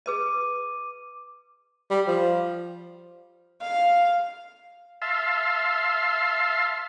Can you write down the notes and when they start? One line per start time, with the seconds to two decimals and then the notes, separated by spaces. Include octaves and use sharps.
0.06 G#4 B4 D#5 D6 D#7
1.90 G3
2.07 F3
3.61 F5
5.02 E5 F5 A5 C6